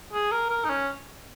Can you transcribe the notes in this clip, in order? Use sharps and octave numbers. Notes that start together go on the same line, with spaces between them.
G#4
A#4
A#4
D#4
C#4